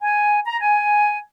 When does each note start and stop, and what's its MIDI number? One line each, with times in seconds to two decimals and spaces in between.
0.02 0.39 80
0.46 0.57 82
0.61 1.18 80